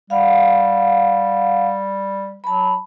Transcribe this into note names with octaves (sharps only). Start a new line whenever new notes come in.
G3 F5 F#5
F#3 A5 B5